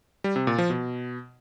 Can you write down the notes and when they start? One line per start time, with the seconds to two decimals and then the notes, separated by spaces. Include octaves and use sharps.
0.24 G3
0.36 C3
0.47 A#2
0.58 F3
0.70 B2